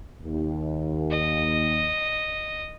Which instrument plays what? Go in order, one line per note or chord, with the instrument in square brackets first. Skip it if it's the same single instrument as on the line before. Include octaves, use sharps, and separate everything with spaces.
[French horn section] D#2
[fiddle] D#5